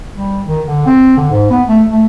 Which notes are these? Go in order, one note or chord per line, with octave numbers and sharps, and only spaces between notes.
G3
D#3
D3
C4
D3
G#2
B3
A3
A3